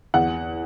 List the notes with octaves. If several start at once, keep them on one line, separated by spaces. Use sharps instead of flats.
E2 F#5